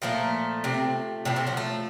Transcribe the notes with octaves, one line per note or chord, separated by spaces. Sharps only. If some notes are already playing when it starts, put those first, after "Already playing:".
A#2 F3 A3 A#3
C3 C4
A2 C3 F3 A3 C4
C3 C4
F#3 F#4
A3 A4